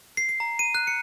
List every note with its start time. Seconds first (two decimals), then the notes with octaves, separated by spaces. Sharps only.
0.17 C7
0.29 C7
0.40 A#5
0.59 D#7
0.75 F#6
0.87 C#7